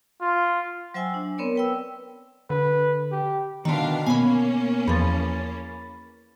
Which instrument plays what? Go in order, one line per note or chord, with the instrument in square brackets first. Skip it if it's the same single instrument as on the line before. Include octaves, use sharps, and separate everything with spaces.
[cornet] F4
[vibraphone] F#3 C5 E5 G5 G#5 E6
D4
B3 C4 A#4 C#5 D5
B4 G5 E6
[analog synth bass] D3 [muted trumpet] B4
[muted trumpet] G4
[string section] B2 D4 F5 [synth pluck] D3 D#3
[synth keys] B2 B3 [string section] A#3 C#4 [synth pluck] G#5 B5
[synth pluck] E2 F3 [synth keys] B5 A6